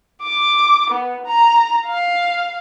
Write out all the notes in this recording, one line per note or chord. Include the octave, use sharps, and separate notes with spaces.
D6
B3
A#5
F5